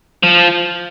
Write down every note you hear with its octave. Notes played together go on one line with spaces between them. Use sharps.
F3